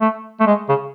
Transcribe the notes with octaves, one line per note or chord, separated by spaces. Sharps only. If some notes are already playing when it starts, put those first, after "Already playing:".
A3
A3
G#3
C#3